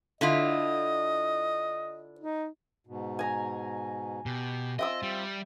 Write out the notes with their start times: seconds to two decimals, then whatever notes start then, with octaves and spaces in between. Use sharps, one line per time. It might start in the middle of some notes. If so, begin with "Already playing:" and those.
0.21 D3 E4 F4 D#5
2.20 D#4
2.87 G#2 B2
3.19 G#5 A#5
4.26 B2 G4
4.79 C4 F4 D#5 E5 G5 E6
5.03 G3